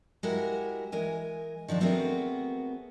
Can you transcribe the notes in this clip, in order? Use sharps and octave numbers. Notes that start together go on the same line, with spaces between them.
G#3 E4 F#4 G4 A#4 F#5
E3 G#3 A#4 G#5
D#3 F3 C4 D4
A3 B3 C4 F#4 G#4 A#4